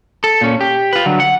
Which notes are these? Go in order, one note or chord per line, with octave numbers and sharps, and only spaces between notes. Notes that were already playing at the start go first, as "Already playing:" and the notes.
A4
A#2 C#4
G4
F4 B4
D3 F#3
F#5